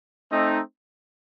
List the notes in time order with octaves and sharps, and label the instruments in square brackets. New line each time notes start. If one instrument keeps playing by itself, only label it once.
[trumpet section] A3 C4 D#4